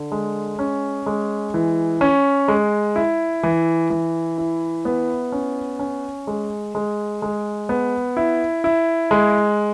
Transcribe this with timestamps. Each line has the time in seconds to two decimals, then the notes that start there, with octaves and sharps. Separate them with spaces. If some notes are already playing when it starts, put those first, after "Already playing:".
Already playing: D3
0.12 G#3
0.59 C#4
1.06 G#3
1.54 E3
2.01 C#4
2.48 G#3
2.96 E4
3.43 E3
3.90 E3
4.38 E4
4.85 B3
5.32 C#4
5.79 C#4
6.27 G#3
6.75 G#3
7.22 G#3
7.69 B3
8.17 E4
8.64 E4
9.11 G#3